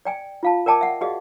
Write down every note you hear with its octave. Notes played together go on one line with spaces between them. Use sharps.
D5 G5 G#5
F4 F5 A5
A#4 D5 G5 A5 D6
E5 F#5
F#4 G#4 D5 D#5 F5